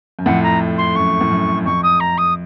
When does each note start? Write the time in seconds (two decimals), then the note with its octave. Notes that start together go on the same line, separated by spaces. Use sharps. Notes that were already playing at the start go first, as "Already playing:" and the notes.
0.19 F#2
0.26 F2 A2 F#5
0.43 A#5
0.78 C6
0.95 F#2 C#6
1.21 A2
1.30 F#2
1.65 F2 C#6
1.83 D#6
2.00 A#5
2.18 D#6